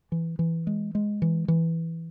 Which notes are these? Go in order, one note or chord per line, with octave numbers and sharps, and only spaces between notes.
E3
E3
G#3
G#3
E3
E3